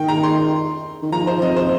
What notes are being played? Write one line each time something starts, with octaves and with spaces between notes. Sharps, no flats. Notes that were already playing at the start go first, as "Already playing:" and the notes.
Already playing: D#3 G5
A#5
C6
D#3
F3 A#5
C5
F2 D#5
C5